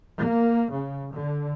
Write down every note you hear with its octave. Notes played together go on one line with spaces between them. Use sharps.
A#3
C#3
D3